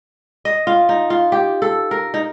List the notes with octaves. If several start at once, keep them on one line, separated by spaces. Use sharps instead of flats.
D#5
F4
D#4
F4
G4
A4
A#4
D#4